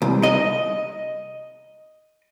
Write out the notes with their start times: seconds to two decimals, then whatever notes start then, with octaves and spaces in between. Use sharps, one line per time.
0.02 C2
0.23 D#5